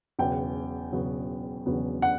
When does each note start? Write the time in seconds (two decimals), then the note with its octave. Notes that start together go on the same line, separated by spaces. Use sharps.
0.19 E1 E2 C#3 F#3 B3 G5
0.92 E1 E2 C#3 F#3 B3
1.66 E1 E2 C#3 F#3 B3
2.02 F#5